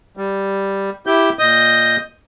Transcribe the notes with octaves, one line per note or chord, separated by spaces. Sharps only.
G3
E4 G4 G6
A#2 D#5 D#6 G6